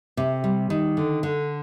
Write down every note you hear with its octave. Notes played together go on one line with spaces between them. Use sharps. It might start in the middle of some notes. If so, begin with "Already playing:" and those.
C3
G3
D#3
D3
D3